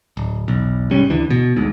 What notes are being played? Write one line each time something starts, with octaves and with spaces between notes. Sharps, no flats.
D1
E1 B1
C2 G#2 G3 C#4
D2 D3 E3
B2
G#1 D2 G#2